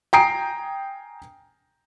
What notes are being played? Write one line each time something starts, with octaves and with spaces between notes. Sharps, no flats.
G5 G#5 A#5 D#6 C7 D7